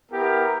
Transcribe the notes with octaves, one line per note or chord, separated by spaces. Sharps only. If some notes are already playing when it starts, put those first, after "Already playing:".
B3 E4 G4 A#4